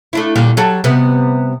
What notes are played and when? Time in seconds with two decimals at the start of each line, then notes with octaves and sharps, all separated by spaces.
0.13 A3 D4 E4
0.36 A#2 D3 G3
0.57 F#3 G3 A4
0.84 C3 G3 B3